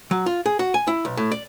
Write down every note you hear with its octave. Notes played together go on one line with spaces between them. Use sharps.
F#3
F4
G#4
F#4
G#5
E4
B1
A2
D5